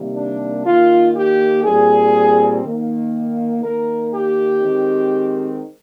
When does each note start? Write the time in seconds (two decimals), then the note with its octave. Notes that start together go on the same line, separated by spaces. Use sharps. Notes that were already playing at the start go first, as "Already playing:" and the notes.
Already playing: C3 D#3 G3 A#3
0.15 D4
0.64 D#3 A#3 F4
1.15 G4
1.64 A#2 G3 C4 G#4
2.64 D#3 A#3
3.63 D#3 A#3 A#4
4.13 G4
4.62 D#3 G#3 C4